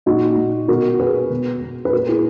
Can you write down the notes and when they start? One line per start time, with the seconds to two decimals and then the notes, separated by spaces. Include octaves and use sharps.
0.06 A#2 D#4 F#4
0.37 A#2
0.68 B2 F#4 A#4
0.99 B2 G#4 B4
1.30 B2
1.62 B2
1.85 B4
1.93 A#2 F#4 A#4
2.08 E4 G#4